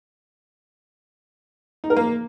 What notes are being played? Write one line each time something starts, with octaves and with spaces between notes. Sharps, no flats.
D#4
A#4
A#3